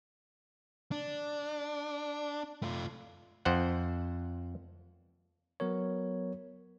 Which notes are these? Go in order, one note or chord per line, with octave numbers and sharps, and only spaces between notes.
D4
A3 F4
F2 C5 F#5
F#3 B3 A#4 C#5